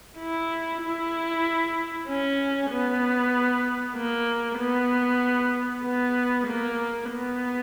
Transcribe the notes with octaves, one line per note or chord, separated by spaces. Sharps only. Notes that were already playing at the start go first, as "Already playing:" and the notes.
E4
E4
C#4
B3
A#3
B3
B3
A#3
B3